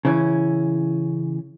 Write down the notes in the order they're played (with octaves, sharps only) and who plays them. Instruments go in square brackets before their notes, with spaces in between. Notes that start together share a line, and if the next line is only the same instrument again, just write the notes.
[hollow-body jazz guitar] C#3 E3 C#4